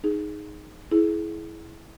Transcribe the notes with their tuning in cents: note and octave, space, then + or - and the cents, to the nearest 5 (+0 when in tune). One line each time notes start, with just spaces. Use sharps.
D#4 +0 G#4 +0
E4 -5 G#4 +25